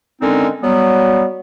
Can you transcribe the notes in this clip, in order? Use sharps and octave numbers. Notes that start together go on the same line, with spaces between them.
D3 D#3 G#3 C4 C#4 D#4
F#3 G3 B3